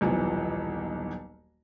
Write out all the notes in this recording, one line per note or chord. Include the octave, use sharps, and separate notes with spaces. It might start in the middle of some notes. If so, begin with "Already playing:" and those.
D#1 B1 E3 F3